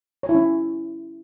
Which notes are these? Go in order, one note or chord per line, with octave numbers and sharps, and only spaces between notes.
C#5
E4
C#4